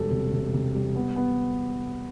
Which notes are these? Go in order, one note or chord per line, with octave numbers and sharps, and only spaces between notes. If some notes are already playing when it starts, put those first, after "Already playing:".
Already playing: E1 G3 A4
C3
C3
C3
G3
B3
B3